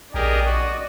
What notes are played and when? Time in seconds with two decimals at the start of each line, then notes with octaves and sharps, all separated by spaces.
0.14 A#1 G4 G#4 A#4 D5 D#5
0.45 F#4